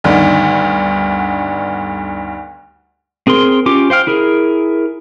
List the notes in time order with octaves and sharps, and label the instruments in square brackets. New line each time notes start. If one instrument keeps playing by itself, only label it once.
[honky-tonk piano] D2 G2 D3 D#3 B3
[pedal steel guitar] C4 G#4 A#4 C6
C#4 F4 G4 D6
C5 F5 G5 F6
E4 G#4 A#4